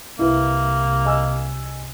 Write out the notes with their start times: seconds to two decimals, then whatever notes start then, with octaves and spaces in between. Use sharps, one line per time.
0.19 C2 A#3 E4 B4
1.05 D#5 G#5 E6